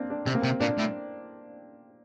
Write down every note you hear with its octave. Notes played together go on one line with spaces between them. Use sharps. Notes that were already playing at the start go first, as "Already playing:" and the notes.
Already playing: A#3 C4 D4
D4
C3 C4
A#3
C3 C4
A#2 D4
A2